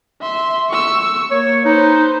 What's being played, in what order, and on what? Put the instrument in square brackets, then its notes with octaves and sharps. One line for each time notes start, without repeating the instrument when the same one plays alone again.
[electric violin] E5 C6
C#6 E6
[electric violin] A#3 [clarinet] C#5
[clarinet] D#4 [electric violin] B4 C5